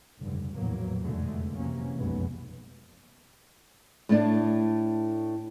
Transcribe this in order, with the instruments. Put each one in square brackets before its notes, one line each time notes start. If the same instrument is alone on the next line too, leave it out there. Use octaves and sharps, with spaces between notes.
[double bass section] F1 C#2 G2 D3
A#1 E2 A2 F#3 A#3
F1 B1 E2 D3 G#3 A3
C3 E3 F#3 A#3 C#4
F1 B1 F#2 F#3 G#3 B3
[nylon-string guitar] A2 A3 D4